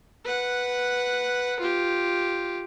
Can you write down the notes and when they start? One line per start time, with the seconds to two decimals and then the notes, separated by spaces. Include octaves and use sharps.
0.24 B4 F#5
1.60 F4 G4